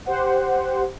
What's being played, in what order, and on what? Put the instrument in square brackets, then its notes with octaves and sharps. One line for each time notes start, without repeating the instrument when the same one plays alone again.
[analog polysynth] G4 C5 F#5